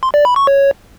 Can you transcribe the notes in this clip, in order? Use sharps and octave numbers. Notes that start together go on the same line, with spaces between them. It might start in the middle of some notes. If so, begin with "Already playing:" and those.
C6
D5
B5
C#6
C#5